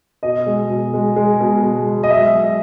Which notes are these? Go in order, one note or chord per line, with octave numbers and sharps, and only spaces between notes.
B2 D#5
G#3
B2
G#3
G#3
B2
G#3
G#3
D#5
F#3 E5
F#3